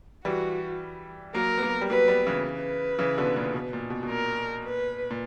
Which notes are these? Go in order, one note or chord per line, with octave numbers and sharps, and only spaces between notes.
E3 G3 F#4
F#3 A#3 A#4
B3
F#3 A#3
G3
F#3 A#3 B4
G3 B3
C#3 E3
B4
C#3 E3
B2 D3
A#2 C#3
B2
A#2
B2
B2
A#2 A#4
B4
A#2